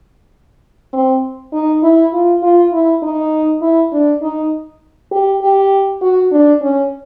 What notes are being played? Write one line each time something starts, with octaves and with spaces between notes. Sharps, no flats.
C4
D#4
E4
F4
F4
E4
D#4
E4
D4
D#4
G4
G4
F#4
D4
C#4